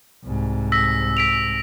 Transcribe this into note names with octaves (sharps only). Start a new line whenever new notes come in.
C2 G#2
E6 A#6 B6
B6 D7 F7